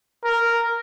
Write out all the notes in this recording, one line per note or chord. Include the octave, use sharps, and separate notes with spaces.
A#4